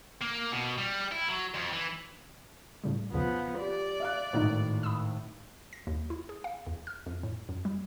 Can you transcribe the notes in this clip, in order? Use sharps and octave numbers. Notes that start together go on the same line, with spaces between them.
A#3
B2
G3
E4
F#3
F2
E3
A2 C#3 G3
B1 E2 C#3 F3 B3
G4 D5
E5 F5 F#6
G#1 A2 D#3 D#4 F4 C5
B5 D#6 E6
A#6
D#2
E4
G#4
F5
E2
F6
F2
A2
F#2
G3